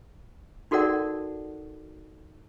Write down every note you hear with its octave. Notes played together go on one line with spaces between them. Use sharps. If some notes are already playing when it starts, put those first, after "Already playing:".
D#4 F#4 A4 A#4 D5 F#5